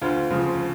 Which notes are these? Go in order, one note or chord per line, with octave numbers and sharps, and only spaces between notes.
D2 F4
C#3 F3